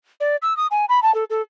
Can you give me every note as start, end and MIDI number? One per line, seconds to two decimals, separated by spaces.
0.20 0.36 74
0.42 0.56 88
0.57 0.67 87
0.71 0.85 80
0.89 1.02 83
1.03 1.14 81
1.15 1.24 69
1.30 1.42 69